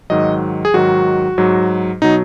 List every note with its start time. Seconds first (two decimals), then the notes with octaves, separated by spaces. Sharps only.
0.10 G#2 D#3 F#3 D#5
0.65 G#4
0.74 G#2 D#3 F#3 F#4
1.38 G#2 F#3
2.02 B2 F#3 D#4